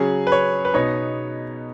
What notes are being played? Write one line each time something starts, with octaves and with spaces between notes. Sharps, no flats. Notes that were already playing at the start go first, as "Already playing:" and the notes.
Already playing: C#3 F#3 C#4 G#4
B4
C#5
B4
B2 B3 D#4 C#5